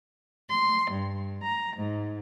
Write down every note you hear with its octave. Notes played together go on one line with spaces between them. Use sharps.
C6
G2
A#5
G#2